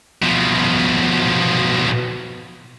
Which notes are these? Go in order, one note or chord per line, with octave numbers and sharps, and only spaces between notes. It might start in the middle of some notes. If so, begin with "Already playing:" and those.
B2 F3